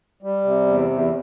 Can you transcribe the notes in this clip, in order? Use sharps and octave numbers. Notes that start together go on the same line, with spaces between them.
G3
C3
E2
E2